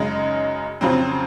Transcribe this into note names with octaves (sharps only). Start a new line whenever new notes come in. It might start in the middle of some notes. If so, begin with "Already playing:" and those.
Already playing: F#2 C#3 G#3 D#4
F2 C#3 F#3 C4